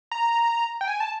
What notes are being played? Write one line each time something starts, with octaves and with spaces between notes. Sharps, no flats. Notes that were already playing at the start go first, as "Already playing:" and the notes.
A#5
G5
G#5
A5